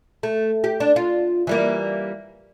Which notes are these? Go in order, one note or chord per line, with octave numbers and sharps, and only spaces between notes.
A3
G4
D4
F4
E3 G3 A#3